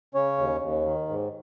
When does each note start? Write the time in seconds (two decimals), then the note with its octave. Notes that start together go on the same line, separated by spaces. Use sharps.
0.14 C#3 C#4 C#5
0.38 D#2
0.61 D#2
0.85 D#3
1.08 G#2